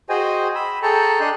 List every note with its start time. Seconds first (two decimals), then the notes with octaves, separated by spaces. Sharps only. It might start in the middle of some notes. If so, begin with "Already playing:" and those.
0.09 F#4 G#4 C5 D#5 G5 G#5
0.55 B5 E6
0.83 G#4 A4 G5 A5 A#5 C#6
1.20 D4 D#5 C6 F#6